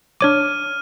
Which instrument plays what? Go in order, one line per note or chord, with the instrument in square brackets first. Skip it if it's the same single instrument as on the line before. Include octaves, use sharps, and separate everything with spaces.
[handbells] D4 C#5 D6 [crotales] F6 D#7